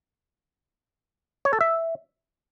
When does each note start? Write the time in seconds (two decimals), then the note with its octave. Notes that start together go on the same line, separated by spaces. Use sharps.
1.45 C#5
1.53 A4
1.61 E5